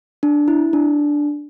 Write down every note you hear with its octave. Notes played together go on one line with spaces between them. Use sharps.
D4
E4
D4